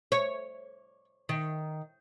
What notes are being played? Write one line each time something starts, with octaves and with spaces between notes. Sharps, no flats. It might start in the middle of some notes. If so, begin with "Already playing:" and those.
C#5
D#3